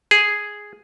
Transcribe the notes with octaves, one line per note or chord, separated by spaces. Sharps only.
G#4